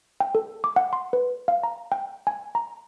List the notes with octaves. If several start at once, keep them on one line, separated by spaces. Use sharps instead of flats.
G5
A4
D6
F#5
C6
B4
F5
A#5
G5
G#5
A#5